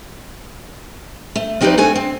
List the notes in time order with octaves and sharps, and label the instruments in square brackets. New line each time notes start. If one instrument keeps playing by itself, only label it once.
[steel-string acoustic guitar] A3
F3 C4 D#4 G4 B4 D5
G2 A3 C4 A4 G#5
C4